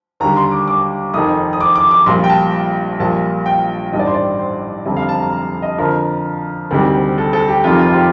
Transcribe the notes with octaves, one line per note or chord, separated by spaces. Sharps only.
D#2 D3 G3 A#5
C6
D6
D6
F1 F2 D#3 D#6
D#6
D6
D6
D6
A#1 A#2 G3 C6
G5
A5
A#1 A#2 G3 A5
G5
A1 G2 D#3 G3 D#5
D5
C5
D5
C5
F1 F2 D3 G3
F5
A5
A#5
D#5
F2 D3 F3 A#4
D2 C3 D#3 G3
A4
A4
G4
F1 F2 C3 D#3 F4
F4
F4
G4